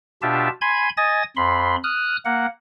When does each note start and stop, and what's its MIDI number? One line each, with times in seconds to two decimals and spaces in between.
0.22 0.49 47
0.22 0.49 62
0.22 0.49 65
0.22 0.49 67
0.22 0.49 76
0.22 0.49 81
0.61 0.89 80
0.61 0.89 83
0.61 0.89 84
0.61 0.89 92
0.97 1.23 75
0.97 1.23 80
0.97 1.23 87
0.97 1.23 93
1.36 1.76 41
1.36 1.76 83
1.36 1.76 84
1.84 2.16 87
1.84 2.16 89
1.84 2.16 90
2.25 2.46 58
2.25 2.46 78